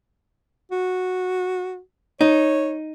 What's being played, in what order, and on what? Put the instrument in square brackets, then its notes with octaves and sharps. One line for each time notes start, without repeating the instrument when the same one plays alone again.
[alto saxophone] F#4
[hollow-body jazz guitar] D#4 [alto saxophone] C#5